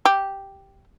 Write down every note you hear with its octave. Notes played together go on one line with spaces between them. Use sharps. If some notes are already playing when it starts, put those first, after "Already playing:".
G4